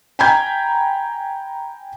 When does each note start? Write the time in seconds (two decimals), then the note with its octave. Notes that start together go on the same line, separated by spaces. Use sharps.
0.19 G5 G#5 A#5 B5 G6 G#6